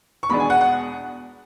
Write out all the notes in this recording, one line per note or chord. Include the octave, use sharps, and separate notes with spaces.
C#6
E2 B2 G#3 B3 D4 B5
G#5
F#5
F#5